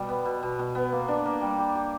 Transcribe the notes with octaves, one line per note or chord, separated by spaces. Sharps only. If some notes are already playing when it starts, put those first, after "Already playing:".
Already playing: B2 G3
B3
B2
B2
B2
B3
A#3
D4
A#3
G3
G4
G4